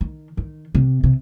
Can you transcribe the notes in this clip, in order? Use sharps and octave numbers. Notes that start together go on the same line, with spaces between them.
D#3
D#3
C3
C3